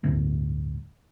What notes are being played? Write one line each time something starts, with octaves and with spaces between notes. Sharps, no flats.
G1 D2 A2